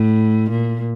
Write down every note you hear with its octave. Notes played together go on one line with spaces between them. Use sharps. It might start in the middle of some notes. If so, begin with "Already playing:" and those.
Already playing: A2
A#2